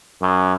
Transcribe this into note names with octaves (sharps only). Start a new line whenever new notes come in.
F#2